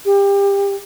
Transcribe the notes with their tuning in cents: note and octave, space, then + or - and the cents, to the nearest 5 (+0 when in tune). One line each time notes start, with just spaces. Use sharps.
G4 +25